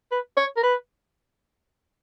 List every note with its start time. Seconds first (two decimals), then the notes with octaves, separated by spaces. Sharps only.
0.12 B4
0.37 C#5
0.57 A#4
0.63 B4